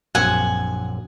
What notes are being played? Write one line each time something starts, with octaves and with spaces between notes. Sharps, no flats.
A#1 F#2 C4 F#5 G#5